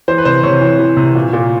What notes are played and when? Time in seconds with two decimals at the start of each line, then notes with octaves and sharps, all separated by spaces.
0.08 E3 C5
0.18 B4
0.25 C3 C5
0.43 C3 C#5
0.61 E3
0.79 E3
0.97 C3
1.15 A#2
1.33 A#2